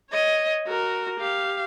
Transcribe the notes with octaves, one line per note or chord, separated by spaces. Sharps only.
C#5 D#5
F#4 A#4
G4 F5